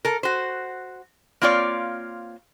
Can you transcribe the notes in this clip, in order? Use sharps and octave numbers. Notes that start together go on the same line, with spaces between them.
A4 A#4
F#4 C5
A#3 C4 F4 C#5 D5 F5